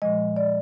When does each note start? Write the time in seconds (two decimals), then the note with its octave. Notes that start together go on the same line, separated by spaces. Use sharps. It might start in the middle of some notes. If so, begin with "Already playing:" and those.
0.02 A#2 F3 G#3 D#5
0.36 D5